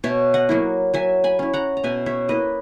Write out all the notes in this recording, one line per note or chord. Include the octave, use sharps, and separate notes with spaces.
B2 C#5 E5
D#5 F#5
F#3 A#3 E4
F#3 E5 G#5
G#5 B5
C#4 E4
F#5 A#5
A#5
B2 E5 G#5
C#5 E5
A#3 E4 B4 D#5